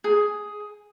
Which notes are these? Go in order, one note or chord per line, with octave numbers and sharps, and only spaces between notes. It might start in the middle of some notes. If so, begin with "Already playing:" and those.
G#4